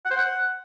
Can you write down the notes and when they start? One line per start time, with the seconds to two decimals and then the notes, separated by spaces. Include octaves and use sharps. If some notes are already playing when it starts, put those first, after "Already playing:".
0.05 F#5
0.11 C5
0.16 F#5